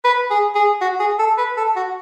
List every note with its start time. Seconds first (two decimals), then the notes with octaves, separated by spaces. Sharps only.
0.04 B4
0.30 G#4
0.55 G#4
0.81 F#4
1.00 G#4
1.19 A4
1.38 B4
1.57 A4
1.76 F#4